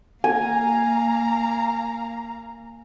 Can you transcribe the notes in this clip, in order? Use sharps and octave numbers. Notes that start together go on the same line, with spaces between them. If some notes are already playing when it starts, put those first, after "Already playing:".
A#3 F5 G#5 A#5